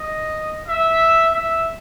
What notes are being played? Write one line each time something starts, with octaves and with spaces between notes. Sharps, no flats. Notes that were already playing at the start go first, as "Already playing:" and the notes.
Already playing: D#5
E5
E5